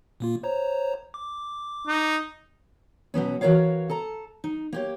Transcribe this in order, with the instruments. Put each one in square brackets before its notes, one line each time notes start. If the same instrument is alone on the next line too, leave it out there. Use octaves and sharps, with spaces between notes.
[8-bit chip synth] A#2 A#3 F4
C5 C#5 A#5
D6
[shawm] D#4
[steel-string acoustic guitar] B2 F#3 B3 C#4
E3 F#4 G#4 A#4 C#5 F5
A4 A5 A#5
D#4
A#3 G4 C#5